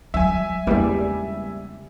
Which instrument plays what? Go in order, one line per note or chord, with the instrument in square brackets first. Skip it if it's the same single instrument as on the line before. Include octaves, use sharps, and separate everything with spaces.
[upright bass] F#3 G3 [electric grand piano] E5 G#5
[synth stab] A#1 E2 G3 [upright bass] C#3 G#3